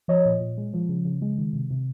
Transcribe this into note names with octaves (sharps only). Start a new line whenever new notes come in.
F3 C#5 D#5
A#2
A#2
G#3
F3
C#3
C#3
G#3
D#3
C3
C3